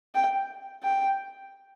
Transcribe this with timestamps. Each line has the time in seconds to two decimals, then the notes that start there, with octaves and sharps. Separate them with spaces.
0.15 G5
0.83 G5